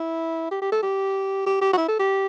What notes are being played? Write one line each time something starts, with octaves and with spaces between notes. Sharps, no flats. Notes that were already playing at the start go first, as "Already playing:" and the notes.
Already playing: E4
G4
G4
A4
G4
G4
G4
F#4
E4
A4
G4